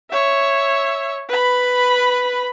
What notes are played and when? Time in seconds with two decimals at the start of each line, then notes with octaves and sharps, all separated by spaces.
0.11 C#5 E5
1.29 B4 B5